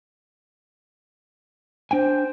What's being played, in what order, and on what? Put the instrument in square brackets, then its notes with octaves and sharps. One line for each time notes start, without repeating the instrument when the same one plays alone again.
[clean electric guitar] D4 G5 G#5 [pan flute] C5